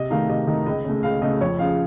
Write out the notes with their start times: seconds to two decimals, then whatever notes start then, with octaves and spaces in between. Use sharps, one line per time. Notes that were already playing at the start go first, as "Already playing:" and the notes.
Already playing: C3 D#5
0.10 D#3 A3 D#4 F5
0.29 C3 D#5
0.47 D#3 A3 D#4
0.66 C#2 D#5
0.85 C#3 A3
1.03 C#2 F5
1.22 C#3 A3 D#5
1.41 F2 C#5
1.59 C#3 F3 F5